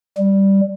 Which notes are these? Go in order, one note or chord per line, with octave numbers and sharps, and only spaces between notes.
G3